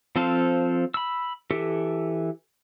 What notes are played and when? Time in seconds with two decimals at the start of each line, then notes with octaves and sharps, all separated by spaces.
0.16 F3 C4 A4 C5 F5
0.94 B5 E6
1.51 E3 G4 A4